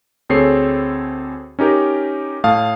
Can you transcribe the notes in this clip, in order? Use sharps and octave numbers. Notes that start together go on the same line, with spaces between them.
D2 C4 G#4 A4 C#5 C7
C#4 D#4 G4 A#4
A2 F5 A5 D#6